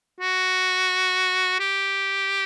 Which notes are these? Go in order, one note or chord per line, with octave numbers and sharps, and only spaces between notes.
F#4
G4